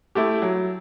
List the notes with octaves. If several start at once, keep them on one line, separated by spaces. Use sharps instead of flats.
A3 E4 G4
F#3